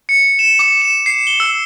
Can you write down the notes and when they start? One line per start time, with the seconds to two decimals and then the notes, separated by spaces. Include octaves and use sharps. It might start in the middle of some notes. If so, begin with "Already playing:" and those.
0.09 C#7
0.39 E7
0.59 D6
0.82 E7
1.06 C7
1.27 G7
1.40 E6